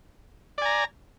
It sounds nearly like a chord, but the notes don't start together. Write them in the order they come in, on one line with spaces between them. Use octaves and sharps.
D5 G#5 A#5